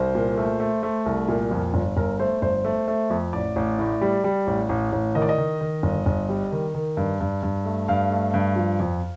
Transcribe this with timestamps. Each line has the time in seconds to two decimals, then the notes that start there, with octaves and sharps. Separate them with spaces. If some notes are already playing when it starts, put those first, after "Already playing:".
Already playing: C2 C5
0.15 A#2
0.38 A3
0.60 A3
0.83 A3
1.06 C2
1.28 A#2
1.51 F2
1.74 G1
1.97 G1 A#4
2.20 A3 C5
2.42 G1 C5
2.65 A3
2.88 A3
3.10 F2
3.33 A1 D5
3.56 A1
3.79 A2
4.01 G3
4.24 G3
4.47 A1
4.69 A1
4.92 A1
5.15 D#3 D#5
5.22 D5
5.29 D#5
5.38 D#3
5.61 D#3
5.83 G1
6.06 G1
6.29 G3
6.52 D#3
6.75 D#3
6.97 G2
7.20 G2
7.43 G2
7.65 A3
7.88 G2 F5
8.11 A3
8.34 G2
8.56 F3
8.80 F2